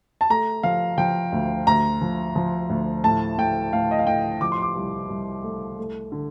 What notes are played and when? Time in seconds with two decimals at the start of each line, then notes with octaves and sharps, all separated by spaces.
0.21 A5
0.30 A3 A#5
0.63 F3 F5
0.98 F3 G5
1.32 D2
1.67 D2 A#5
2.01 F3
2.36 F3
2.69 D2
3.04 A2 A5
3.38 A2 G5
3.73 A2 F5
3.91 D#5
3.99 F5
4.06 A2 G5
4.41 F3 D6
4.52 C6
4.62 D6
4.76 C2
5.10 C2
5.44 A3
5.78 A3
6.12 D3